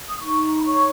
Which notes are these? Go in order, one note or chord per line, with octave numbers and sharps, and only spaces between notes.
D#6
D#4 C#6
B5
C#5 C#6